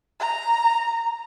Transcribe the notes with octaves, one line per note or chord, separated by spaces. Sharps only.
A#5